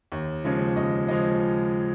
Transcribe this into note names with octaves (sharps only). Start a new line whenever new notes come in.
D#2
C#3 F3 G#3 C#4
D#2 D#5
C#3 F3 G#3 C#4 D#5